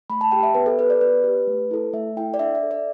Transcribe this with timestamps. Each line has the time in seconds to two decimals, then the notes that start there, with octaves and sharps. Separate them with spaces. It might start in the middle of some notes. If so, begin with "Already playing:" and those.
0.10 A3 B5
0.21 A5
0.31 G4 G5
0.43 E5
0.55 B3 B4
0.66 A4
0.78 G4 B4
0.90 D5
1.01 B3 B4
1.24 G4
1.47 A3
1.71 E4 A4
1.93 A3 E5
2.17 E4 A4 G5
2.34 D5
2.39 D4 E5
2.55 E5
2.63 A4
2.71 D5